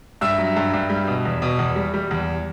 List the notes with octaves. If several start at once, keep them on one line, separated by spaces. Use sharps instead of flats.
G2 E5 E6
F#3
G2
G2
G3
B2
E2
B2
E2
G3
G3
E2